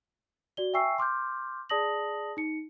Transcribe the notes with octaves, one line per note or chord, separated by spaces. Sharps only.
F#4 D5 G7
E5 G5 G#5 C#6 E6 C7
C6 D6 F6 G6
G#4 D5 A5 D#6 A#6 F#7
D#4 C#7